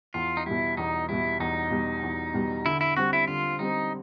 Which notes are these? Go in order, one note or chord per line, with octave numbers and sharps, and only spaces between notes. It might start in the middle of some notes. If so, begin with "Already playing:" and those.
E2 F4
D#4
B2 G3 E4
E2 D#4
B2 G3 E4
E2 D#4
B2 G3
E2
B2 G3
D3 E4
E4
G3 C4 F#4
E4
D3 F4
G3 C4 D#4